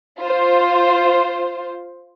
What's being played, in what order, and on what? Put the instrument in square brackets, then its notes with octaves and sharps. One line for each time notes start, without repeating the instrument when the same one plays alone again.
[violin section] F4 C5